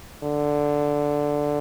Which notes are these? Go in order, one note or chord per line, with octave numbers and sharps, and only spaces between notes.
D3